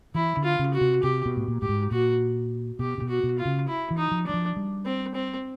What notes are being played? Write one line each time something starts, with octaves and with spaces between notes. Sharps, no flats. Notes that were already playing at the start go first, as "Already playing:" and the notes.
E3 E4
D3
F4
C#3
F#4
C3
C3 G4
B2
A2
A#2
A2 G4
G#2
A#2 F#4
B2 G4
C3
B2
F#4
B2
F4
C#3
E4
E3
D#4
F3
F#3 D4
F3
G3
C4
C4